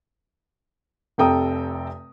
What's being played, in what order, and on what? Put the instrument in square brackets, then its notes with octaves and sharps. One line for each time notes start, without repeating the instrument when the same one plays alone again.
[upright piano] F1 C3 A4 G5 A#5 D#6